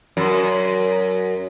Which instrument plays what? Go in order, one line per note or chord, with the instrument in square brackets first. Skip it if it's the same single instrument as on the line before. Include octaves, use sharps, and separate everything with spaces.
[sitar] F#2